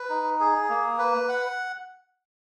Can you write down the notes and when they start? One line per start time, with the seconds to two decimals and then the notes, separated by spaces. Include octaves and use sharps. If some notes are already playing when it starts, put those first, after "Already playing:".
Already playing: B4
0.10 D#4
0.40 G#4
0.69 A#3
0.98 B4
1.29 F#5